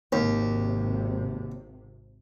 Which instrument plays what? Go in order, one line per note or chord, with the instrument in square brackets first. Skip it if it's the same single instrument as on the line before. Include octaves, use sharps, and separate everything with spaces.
[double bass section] G#1 C3 [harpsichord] D#2